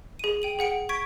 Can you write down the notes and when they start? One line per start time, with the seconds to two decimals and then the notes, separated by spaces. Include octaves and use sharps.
0.19 G#4 D#7
0.42 G5 D#7 F#7
0.59 G#4 F#5 C#7 D7
0.89 C#6 G#6 B6 D7